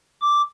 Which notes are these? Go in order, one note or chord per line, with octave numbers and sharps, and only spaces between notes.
D6